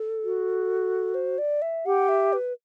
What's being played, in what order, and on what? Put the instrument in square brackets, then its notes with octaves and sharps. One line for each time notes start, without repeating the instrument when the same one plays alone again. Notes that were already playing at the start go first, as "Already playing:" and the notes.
Already playing: [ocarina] A4
[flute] F#4
[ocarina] C5
D5
E5
[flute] G4 [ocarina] F#5
[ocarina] E5
B4